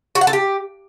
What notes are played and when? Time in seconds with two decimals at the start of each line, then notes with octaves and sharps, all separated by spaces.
0.15 F#4
0.21 F#5
0.27 A4
0.33 G4